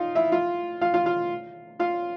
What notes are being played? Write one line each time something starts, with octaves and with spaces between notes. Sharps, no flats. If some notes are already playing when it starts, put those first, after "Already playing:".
Already playing: D#4 F4 F5
E4 E5
F4 F5
F4 F5
F4 F5
F4 F5
F4 F5